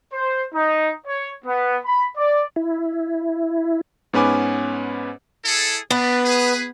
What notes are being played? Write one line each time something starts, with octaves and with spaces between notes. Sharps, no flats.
C5
D#4
C#5
B3
B5
D5
E4
G#2 B3 C#4 B4 G#5 D6
E4 G#4 A4
B3 D4 B4
G#4 B4